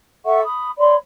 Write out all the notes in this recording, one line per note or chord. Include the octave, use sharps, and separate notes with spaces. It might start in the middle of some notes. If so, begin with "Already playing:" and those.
A4 E5 F#5 C#6
B5 D#6
C#5 D5 B5 C6